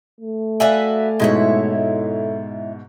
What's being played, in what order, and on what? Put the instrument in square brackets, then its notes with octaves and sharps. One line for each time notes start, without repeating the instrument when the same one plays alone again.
[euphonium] A3
[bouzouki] F#4 B4 E5 [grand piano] D5 F5 G#5
[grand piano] G#2 B2 [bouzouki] G#3 E4 C#5
[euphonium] A4